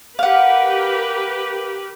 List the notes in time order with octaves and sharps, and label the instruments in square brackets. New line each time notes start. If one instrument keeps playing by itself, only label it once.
[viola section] G4 A#4 B4 [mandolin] F5 F#5